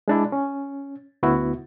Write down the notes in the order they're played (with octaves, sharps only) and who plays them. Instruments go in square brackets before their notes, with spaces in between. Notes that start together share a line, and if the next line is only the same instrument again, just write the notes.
[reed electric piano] G#3 D4 E4
C#4
D2 B3 E4 F#4